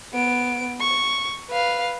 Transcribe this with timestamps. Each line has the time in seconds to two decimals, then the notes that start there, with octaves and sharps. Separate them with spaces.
0.13 B3 D7
0.81 C#6
1.50 B4 F5